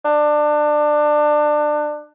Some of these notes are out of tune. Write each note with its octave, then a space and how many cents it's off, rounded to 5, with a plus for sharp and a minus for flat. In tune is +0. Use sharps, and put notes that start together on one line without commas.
D4 +25